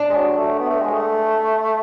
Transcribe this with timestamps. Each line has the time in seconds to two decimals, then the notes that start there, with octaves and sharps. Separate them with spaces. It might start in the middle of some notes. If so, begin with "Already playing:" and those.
Already playing: D4
0.10 G#3
0.16 F#3
0.37 A3
0.59 B3
0.70 A3
0.81 G#3
0.93 A3